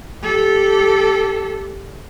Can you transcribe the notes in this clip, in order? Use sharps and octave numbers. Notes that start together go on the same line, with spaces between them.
G4 A4